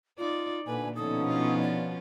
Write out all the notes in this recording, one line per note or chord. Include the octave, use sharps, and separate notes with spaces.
D#4 F4 D5
D2 A#2 D3 B4 G#5
B2 D3 F3 C#4 D#4 A4 D#6
B3 F4
D5